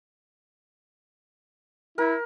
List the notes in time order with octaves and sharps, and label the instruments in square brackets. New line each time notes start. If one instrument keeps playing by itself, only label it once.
[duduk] E4 [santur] A#4